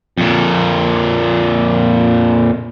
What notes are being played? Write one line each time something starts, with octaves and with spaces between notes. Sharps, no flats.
F2 A#2